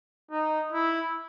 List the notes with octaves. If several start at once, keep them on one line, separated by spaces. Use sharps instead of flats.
D#4
E4